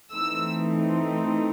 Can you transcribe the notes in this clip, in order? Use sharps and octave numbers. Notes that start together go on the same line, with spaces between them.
E3 A3 C4 D#4 E6